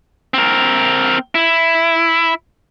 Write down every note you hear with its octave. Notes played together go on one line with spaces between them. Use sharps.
C4 A#4
E4